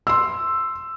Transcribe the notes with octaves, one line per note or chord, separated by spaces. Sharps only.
C6 E6